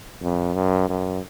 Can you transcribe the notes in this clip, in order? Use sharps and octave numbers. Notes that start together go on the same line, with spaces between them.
F2
F#2
F#2